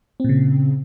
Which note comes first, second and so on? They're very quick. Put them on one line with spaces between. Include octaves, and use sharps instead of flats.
C4 A#2 C#3